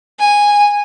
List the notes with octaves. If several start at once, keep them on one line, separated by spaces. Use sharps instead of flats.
G#5